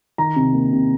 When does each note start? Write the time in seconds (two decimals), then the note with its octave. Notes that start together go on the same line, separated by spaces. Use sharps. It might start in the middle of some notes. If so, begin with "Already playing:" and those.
0.18 D#3 A#5
0.36 C3
0.54 A#3
0.73 C3